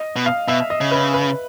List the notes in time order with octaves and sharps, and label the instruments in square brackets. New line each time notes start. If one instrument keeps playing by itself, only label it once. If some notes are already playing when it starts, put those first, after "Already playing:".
Already playing: [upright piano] D#5
[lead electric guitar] B2
[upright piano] F5
[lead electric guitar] B2 [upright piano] E5
[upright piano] D#5
[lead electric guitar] C#3
[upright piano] B4
B4